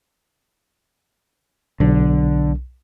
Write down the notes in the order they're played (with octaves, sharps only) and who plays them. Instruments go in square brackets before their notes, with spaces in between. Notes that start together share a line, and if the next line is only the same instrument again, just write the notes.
[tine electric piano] B1 [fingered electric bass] D3